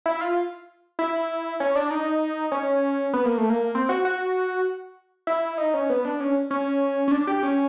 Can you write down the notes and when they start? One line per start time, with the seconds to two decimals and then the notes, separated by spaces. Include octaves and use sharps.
0.06 E4
0.21 F4
0.99 E4
1.60 C#4
1.76 D4
1.91 D#4
2.52 C#4
3.13 B3
3.25 A#3
3.38 A3
3.50 A#3
3.75 C4
3.89 F#4
4.05 F#4
5.27 E4
5.58 D#4
5.74 C#4
5.90 B3
6.05 D4
6.20 C#4
6.51 C#4
7.08 C#4
7.11 D4
7.27 G4
7.43 C#4